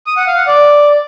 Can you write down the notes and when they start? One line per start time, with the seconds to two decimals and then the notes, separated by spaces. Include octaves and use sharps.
0.07 D#6
0.17 F#5
0.27 F5
0.37 F#5
0.47 D5